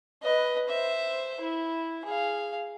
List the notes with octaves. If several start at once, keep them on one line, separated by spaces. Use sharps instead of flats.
B4 D#5
C5 E5
E4
G#4 F5